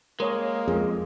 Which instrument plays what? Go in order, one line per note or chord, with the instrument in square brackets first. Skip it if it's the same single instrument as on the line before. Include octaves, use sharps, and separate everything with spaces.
[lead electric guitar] G#3 [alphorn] A#3 [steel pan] A#4 C#5 D#6
[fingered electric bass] F2 [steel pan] G#4